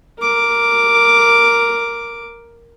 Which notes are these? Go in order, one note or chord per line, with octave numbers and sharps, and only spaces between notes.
A#4 D6